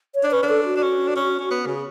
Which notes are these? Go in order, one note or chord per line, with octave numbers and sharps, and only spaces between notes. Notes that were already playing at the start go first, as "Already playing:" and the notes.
C#5
D4
C#4 B4
D4
A4
F#4
D4
C#4
D4
C#4
C#4
B3
C#3